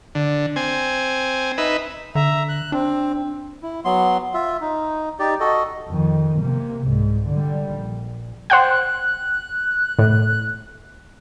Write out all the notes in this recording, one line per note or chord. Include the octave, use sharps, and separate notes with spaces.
D3
C4 G#5
D#4 B4 E5
D3 E5 A#5
F#6
C4 D4
E4
F#3 B3 C6
F4 E5
D#4
D#4 G4 D5
F#4 A4 D#5
F2 D#3
C3 A#3
C2 G#2
D3 G3
A#1
C5 F#5 G5 F#6
A2